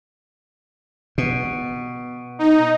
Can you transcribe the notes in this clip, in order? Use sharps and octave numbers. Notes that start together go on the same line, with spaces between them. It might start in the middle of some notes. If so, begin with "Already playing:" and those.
B2
D#4